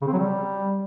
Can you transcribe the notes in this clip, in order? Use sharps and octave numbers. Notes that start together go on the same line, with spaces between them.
C#3
C4
F#3
G3